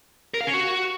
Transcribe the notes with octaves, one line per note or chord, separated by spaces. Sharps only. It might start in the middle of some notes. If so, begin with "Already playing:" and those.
A#4
F5
C#4
F#4